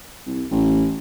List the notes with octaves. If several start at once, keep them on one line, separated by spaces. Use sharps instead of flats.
C2
A1